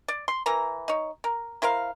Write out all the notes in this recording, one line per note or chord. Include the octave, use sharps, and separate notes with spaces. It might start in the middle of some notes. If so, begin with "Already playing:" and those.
D5
C6
E3 A#4 A#5
D#4 C#5
A#4
E4 A#4 C5 F5